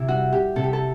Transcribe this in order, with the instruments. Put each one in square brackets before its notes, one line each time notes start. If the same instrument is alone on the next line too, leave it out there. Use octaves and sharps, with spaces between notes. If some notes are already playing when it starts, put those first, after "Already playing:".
Already playing: [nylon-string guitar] C3 [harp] E4
[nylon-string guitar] G3 [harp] F#4
[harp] G4
[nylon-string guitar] C3 [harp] A4
[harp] G4
A4